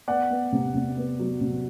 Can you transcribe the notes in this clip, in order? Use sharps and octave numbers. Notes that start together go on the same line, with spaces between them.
B3 D5 F#5
B3
C3
C3
B3
F#3
C3